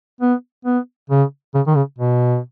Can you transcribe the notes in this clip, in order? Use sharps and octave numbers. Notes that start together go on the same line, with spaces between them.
B3
B3
C#3
C#3
D#3
C#3
B2